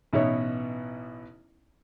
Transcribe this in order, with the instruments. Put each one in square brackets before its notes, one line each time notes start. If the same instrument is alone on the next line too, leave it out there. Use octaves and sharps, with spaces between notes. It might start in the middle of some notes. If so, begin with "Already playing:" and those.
[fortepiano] A1 B2 B3 D#4 E4 C#5